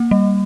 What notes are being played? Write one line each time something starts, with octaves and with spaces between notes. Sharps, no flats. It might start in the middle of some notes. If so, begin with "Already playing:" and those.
Already playing: A#3
G3